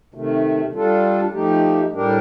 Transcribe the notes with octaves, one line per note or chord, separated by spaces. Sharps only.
C3 D#3 A3
G3 D4 F4 A4
F3 A3 D#4 G4
A2 G3 D4 G4 A#4